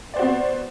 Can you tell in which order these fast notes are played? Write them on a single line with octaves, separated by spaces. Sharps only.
D5 C5 F#4 B3